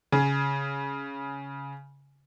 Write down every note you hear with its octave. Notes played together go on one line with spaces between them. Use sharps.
C#3 G#4